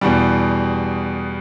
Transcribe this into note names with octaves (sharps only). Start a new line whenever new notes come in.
E2 B2 G3